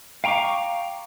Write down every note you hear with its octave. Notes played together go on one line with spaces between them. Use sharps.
F5 G5 A#5 C#6 D6